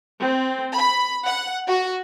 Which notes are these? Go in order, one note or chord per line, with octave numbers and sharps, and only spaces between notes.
C4
B5
F#5
F#4